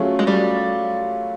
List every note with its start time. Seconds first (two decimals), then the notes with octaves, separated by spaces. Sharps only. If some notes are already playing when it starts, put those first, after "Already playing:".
Already playing: F#3 A3 C#4 F4 G#4
0.19 G#3
0.27 G3